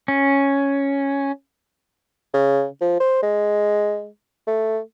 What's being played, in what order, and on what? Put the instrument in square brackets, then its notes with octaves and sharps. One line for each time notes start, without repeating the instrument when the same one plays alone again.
[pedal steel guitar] C#4
[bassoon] C#3
F3
C5
G#3
A3